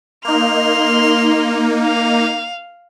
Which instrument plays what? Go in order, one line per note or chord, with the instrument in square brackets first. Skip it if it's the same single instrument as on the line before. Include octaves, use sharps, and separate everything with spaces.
[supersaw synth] A#3 D#4 [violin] C6 F6
[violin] F5